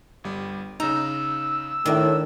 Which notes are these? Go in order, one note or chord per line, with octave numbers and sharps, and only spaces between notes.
G1 G3
C#3 D#4 A#5 E6
A2 D#3 D4